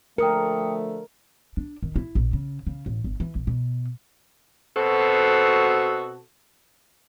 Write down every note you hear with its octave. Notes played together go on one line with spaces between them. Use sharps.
D3 F3 A3 A#4 G5 D#6 C#7
D4
D#3
E4
A#1
C#3
C#3
A1
G1
E3
A#1
B2
B2 C4 F#4 A4